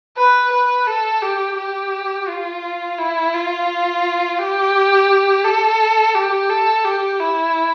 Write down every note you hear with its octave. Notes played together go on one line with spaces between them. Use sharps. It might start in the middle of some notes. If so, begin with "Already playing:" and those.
B4
B4
A4
G4
G4
F4
E4
F4
G4
A4
G4
A4
G4
E4